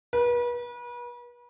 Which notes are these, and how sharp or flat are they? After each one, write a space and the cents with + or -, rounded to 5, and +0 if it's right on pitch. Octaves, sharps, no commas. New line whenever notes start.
B4 -35